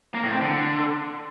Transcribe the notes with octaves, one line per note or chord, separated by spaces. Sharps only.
A#3
A2
C4
D3